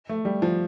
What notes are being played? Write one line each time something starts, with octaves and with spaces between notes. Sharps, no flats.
A3
G3
F3